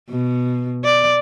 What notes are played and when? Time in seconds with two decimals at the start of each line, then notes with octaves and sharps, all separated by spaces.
0.10 B2
0.85 D5